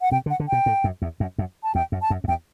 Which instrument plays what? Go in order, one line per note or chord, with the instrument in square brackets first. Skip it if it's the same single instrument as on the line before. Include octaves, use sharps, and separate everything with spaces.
[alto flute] F#5
[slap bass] C3 [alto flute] G5
[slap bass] D3
[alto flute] F#5
[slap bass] D3
[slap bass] B2 [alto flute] G5
[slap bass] A2
F#2
E2
F#2
F#2
[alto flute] A5
[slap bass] E2 [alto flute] G5
[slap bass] F#2
[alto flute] A5
[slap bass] F#2
F#2
[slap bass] E2 [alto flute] G5